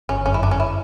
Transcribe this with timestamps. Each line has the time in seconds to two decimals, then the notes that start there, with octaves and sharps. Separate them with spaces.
0.09 G1 C#4
0.26 F#2 C#4
0.34 E4
0.42 G1 D4
0.51 C#4
0.60 E4